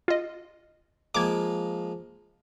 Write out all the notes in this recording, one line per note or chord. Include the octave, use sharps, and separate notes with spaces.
F4 D#5
F3 G#3 A#3 D6 G#6